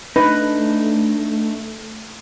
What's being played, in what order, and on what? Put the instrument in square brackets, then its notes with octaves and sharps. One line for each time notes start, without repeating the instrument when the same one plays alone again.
[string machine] A3 [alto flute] D4 [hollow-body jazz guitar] D#4 [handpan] B4